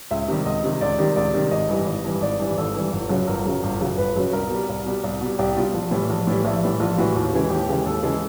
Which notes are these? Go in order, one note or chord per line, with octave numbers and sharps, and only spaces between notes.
C#2 E5
C3 D#3 G3
C#2 D#5
C3 D#3 G3
C#2 D5
C3 D#3 G3
C#2 D5
C3 D#3 G3
G#1 D#5
G2 E3 G3
G#1
G2 E3 G3
G#1 D5
G2 E3 G3
G#1 A4
G2 E3 G3
G1
F#2 C#3 F#3
G1 A#4
F#2 C#3 F#3
G1
F#2 C#3 F#3
G1 B4
F#2 C#3 F#3
C2 A#4
B2 G3
C2
B2 G3
C2
B2 G3
C2 G4
B2 G3 F4
A#1
A2 E3 G3
A#1
A2 E3 G3
A#1 E4
A2 E3 G3
A#1 F4
A2 E3 G3 F#4
D#2 F#4
C#3 E3 G#3
D#2 G4
C#3 E3 G#3
D#2 A4
C#3 E3 G#3 A4